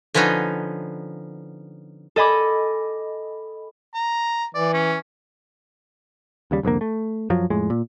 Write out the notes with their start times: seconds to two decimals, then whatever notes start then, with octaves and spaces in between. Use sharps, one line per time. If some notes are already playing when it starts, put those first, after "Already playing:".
0.14 D3 F3 B3 C#4 D#4
2.16 A4 D#5 G#5 B5 D6
3.94 A#5
4.55 E3 D5
4.74 C#4
6.51 D#2 C#3 G3
6.63 C2 F2 D3 A#3
6.81 A3
7.30 F#2 F3 F#3
7.50 F2 A2 G#3
7.70 A#2